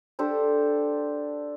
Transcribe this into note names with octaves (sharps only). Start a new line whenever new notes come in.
D4 G4 A4 C5